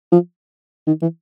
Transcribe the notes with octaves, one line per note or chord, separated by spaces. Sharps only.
F3
D#3
E3